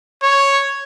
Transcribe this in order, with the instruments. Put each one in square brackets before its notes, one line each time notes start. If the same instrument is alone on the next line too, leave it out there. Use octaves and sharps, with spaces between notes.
[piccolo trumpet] C#5